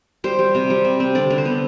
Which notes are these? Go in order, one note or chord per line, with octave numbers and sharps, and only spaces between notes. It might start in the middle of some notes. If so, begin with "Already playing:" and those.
G3 C5
G3
C3
G3
C3
C4
D3 D5
D3
C5
B3